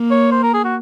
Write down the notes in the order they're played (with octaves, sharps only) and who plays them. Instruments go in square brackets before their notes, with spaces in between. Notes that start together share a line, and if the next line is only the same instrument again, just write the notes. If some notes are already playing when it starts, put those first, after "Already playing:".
Already playing: [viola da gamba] A#3
[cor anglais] C#5
C5
A#4
G#4
F#4